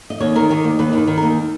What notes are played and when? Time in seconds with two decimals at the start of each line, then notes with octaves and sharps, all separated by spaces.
0.10 D#5
0.20 D#2 C#5
0.36 D#3 A#4
0.50 D#3 G4
0.64 D#2
0.79 D#2 B4
0.93 D#3 B4
1.07 D#3
1.17 A#4
1.23 D#2